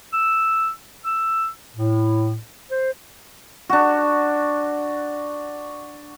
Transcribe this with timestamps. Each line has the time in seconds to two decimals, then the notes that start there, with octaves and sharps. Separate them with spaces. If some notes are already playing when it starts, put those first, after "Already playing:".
0.13 E6
1.04 E6
1.75 A2
2.70 C5
3.69 D4 F#4